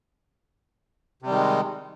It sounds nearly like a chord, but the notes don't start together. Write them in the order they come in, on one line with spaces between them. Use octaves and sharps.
C3 G3 D#3 G#3